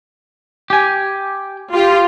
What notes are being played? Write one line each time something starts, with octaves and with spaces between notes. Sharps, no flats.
G4 G#5
F4 G4